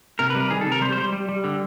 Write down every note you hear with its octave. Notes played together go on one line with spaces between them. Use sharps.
C3 A#4
B4
G3
A#4
D#3 G#4
A4
C3
A#4
G3 C5
C5
G3
G3
G3
D3